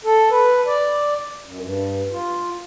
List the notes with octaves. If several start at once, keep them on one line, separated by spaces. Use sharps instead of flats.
A4
B4
D5
F#2
G2
F4